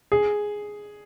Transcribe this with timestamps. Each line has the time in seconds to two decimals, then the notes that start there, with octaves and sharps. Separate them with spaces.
0.12 G#4